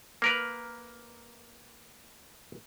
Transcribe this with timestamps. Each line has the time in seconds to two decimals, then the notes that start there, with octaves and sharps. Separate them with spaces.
0.22 A#3 A#4 B4